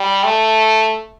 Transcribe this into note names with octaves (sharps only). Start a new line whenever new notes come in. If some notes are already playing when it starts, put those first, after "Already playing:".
Already playing: G3
A3